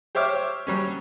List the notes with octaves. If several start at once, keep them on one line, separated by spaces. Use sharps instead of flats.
G4 C5 C#5 E5 D6 F6
F#3 G3 C#4